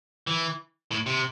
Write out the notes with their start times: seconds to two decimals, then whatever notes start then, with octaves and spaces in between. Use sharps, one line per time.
0.27 E3
0.91 A2
1.06 C3